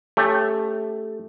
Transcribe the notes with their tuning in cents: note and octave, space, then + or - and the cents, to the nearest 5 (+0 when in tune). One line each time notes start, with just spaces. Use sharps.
A3 +0 C#4 -5 G4 +20